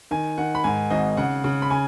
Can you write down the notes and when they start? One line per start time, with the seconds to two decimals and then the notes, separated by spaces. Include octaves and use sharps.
0.11 D#3 G#5
0.38 D#3 F#5
0.55 B5
0.64 G#2 G#5
0.90 G#1 D#5
1.17 C#3 F#5
1.44 C#3
1.62 B5
1.70 C#3 G#5